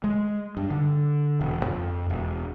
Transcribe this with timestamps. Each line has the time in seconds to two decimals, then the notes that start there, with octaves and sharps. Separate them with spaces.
0.04 G#3
0.57 G2
0.70 D3
1.41 E1
1.66 F2
2.10 E1